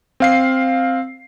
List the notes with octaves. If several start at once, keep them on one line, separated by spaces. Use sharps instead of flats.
C4 F5 C7